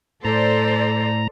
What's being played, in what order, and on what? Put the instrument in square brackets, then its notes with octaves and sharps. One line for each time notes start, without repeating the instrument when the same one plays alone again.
[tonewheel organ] A2 A#5 [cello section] A4 C5 D5